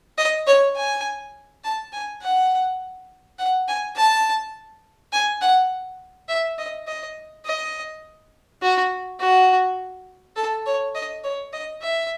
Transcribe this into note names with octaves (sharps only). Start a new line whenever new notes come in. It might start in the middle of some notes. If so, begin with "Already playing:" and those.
D#5
C#5
G#5
A5
G#5
F#5
F#5
G#5
A5
G#5
F#5
E5
D#5
D#5
D#5
F#4
F#4
A4
C#5
D#5
C#5
D#5
E5